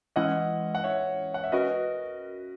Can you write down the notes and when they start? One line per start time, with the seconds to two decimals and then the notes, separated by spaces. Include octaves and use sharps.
0.16 E3 G#3 C#4 E4 D#5 F#5
0.75 F#5
0.84 C#5 E5
1.34 F#5
1.44 E5
1.52 C#4 F#4 A#4 B4 D#5